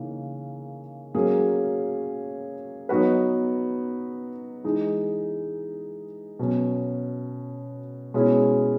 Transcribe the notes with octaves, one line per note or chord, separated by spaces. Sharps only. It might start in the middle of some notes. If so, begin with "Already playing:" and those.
Already playing: C#3 E3 A#3 D#4
F#3 A#3 C#4 G#4 C#5
F#3 B3 D#4 F#4 B4
E3 G#3 D#4
B2 F#3 C#4
B2 G#3 C#4 E4